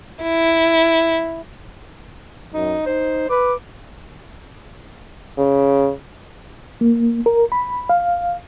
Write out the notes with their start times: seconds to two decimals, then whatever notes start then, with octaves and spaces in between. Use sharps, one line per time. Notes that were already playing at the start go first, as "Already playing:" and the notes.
0.23 E4
2.54 F#2 D#4
2.86 D#4 C5
3.30 B4 D6
5.38 C#3
6.81 A#3
7.26 A#4
7.52 B5
7.89 F5